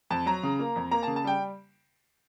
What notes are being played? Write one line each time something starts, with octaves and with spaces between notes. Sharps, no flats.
F2 A5
F#3 A#5
C#3
A#3
F2
A#3 A#5
A5
C#3
A5
G3 G5